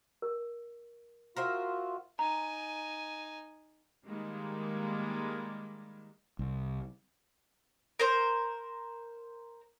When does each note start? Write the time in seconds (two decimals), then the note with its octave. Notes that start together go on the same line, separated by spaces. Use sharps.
0.22 A#4
1.36 F4 F#4 A#4 C5 E5
2.19 D#4 G#5 A#5
4.05 D#3 G3 G#3 A#3
6.39 C2
7.99 A#4 C5